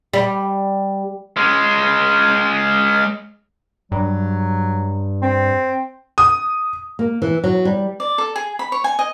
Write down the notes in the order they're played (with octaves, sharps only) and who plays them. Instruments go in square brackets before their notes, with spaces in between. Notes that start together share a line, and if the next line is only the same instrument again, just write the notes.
[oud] G3
[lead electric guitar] G#3 C#4
[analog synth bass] G2 [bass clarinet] F#3
[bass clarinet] C4
[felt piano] D#6
[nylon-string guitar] A#3
E3
F#3
G3
[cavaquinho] D5
A4
G#4
B5
C#5
G#5
D#5